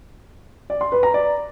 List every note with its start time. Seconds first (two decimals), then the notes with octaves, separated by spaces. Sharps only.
0.70 D5
0.81 C6
0.92 B4
1.03 A#5
1.14 D5